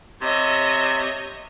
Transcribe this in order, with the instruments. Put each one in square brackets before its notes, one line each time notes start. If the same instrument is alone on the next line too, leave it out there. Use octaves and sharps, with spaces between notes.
[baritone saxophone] C3 [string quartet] C#5 D#5 E5